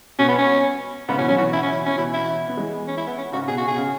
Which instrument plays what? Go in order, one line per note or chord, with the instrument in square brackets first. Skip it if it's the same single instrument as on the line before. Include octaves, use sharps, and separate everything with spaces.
[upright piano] B2 [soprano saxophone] C#4
[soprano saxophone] B3
C#4
[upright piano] G#2 C#3 [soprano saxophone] B3
[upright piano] B2 E3 [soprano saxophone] C#4
[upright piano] C#3 F#3 [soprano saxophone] C#4
[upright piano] B2 E3 [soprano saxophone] F#4
[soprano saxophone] E4
C#4
E4
C#4
[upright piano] B2 E3 [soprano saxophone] E4
[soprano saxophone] E4
[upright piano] B3
E3 G#3
[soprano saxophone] C#4
E4
B3
C#4
[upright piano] G#2 C#3 [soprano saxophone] F#4
[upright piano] B2 [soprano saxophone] G#4
[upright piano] C#3 [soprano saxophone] F#4
[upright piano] B2 [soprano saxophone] G#4
[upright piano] C#3